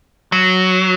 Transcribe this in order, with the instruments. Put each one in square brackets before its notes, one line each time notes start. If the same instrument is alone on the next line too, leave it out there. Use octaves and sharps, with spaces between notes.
[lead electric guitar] F#3